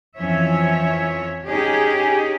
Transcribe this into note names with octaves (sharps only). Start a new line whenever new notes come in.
F2 E3 F3 C#4 C#5 E5
C#4 D#4 G4 G#4